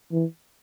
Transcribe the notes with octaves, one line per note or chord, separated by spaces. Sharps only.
E3